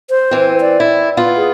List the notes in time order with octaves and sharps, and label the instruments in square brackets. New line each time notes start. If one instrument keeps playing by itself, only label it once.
[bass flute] C5
[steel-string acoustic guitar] E3 C4
[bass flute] D5
[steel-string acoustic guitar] E4
B3 F4
[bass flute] G#4